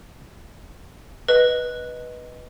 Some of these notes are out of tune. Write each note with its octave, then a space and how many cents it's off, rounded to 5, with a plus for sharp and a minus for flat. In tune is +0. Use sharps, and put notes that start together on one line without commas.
B4 -10 D#5 +0